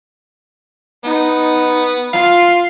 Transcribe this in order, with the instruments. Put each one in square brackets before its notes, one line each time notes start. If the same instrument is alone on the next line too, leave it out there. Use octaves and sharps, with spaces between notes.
[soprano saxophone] B3 [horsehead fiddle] D#4
[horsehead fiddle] F4 [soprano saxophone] F5